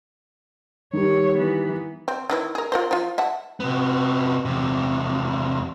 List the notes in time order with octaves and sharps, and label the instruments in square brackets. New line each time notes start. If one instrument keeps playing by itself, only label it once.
[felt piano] D#3 G3 [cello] C#5
[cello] E3 B3
[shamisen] C4
D#3 E3 E4
G#4 A#4
F4 A#4 C5
F3 F4
E5 F#5 A5
[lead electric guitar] C3 B3
E2 C3